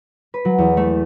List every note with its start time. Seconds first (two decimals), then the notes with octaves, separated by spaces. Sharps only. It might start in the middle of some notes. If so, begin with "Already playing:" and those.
0.34 B4
0.45 F#3
0.58 E2
0.77 A3